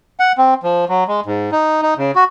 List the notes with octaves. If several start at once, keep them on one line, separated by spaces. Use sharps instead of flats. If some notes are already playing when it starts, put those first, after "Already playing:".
F#5
C4
F3
F#3
G#3
G#2
D#4
D#4
C#3
F#4